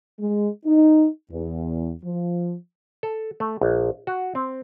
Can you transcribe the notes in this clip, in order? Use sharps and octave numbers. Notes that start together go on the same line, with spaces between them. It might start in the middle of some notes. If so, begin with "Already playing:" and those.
G#3
D#4
E2
F3
A4
A3
A#1
F#4
C4